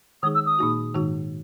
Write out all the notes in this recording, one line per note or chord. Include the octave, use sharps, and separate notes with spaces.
D#3 G#3 D#4 G#4 D#6
E6
D#6
A#2 A#3 D#4 F#4
G#2 D#3 G#3 D#4 F#4